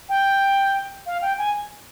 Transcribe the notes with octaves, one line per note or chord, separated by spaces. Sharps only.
G5
F5
G5
G#5